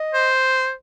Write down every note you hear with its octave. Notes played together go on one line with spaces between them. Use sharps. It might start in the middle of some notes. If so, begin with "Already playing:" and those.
Already playing: D#5
C5